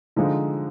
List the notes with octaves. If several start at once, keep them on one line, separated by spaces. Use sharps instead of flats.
D3 F3 G#3 D#4